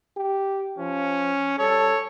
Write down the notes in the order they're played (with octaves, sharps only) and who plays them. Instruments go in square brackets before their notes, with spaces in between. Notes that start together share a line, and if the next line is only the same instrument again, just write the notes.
[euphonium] G4
[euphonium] F3 [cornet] C#4
[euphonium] G3 [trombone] A4 [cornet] C#5